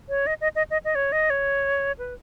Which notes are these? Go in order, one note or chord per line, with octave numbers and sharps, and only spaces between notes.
C#5
D#5
D#5
D#5
D#5
D#5
C#5
D#5
C#5
B4